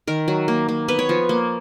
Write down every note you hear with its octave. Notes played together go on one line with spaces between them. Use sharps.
D#3 A#4
F#3
A#3
A#3
B3 B4
C#5
F3
A#3